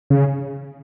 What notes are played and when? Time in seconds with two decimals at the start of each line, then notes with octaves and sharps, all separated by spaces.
0.10 C#3